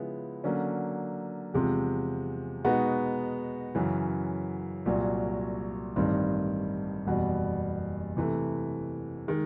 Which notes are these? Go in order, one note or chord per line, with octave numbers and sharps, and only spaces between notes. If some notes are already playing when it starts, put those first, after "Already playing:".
Already playing: C#3 F3 G#3 B3 E4
D3 F#3 A#3 C#4
E2 C3 F3 G#3 C4
B2 G#3 B3 D#4 F#4
F#2 C#3 E3
C2 A#2 F#3
A1 G2 D#3 G3 C4
F#1 E2 B2 G3
C3 E3 A3
D#3 G#3